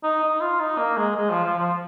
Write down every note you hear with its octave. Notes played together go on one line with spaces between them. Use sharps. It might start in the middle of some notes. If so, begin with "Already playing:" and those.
D#4
D#4
F4
D#4
A#3
G#3
G#3
F3
F3
F3